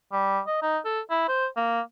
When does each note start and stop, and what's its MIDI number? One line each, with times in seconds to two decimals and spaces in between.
0.12 0.40 55
0.47 0.59 75
0.62 0.78 63
0.85 1.01 69
1.10 1.26 64
1.28 1.46 72
1.57 1.81 58